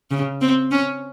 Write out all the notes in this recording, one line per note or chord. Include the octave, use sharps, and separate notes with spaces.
C#3
C4
C#4